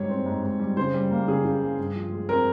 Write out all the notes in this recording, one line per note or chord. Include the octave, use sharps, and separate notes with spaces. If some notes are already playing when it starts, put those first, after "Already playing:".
Already playing: G#2 G3 C#5
C4
G#2
G#2
G3
C#3 C5
G3
A#3
C#3 G#4
C#3
G3
G2
F3
G#3
C4 A#4